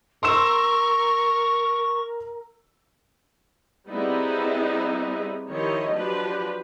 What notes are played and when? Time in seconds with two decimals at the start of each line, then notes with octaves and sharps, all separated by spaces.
0.23 A#4 C6 C#6 E6 E7
3.89 G3 B3 C4 D#4 E4 G#4
5.50 D#3 F3 E4 G4 C#5 D#5
5.93 F3 F#3 D4 G4 B4